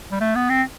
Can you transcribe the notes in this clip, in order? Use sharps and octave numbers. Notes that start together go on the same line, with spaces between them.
G3
A3
B3
C4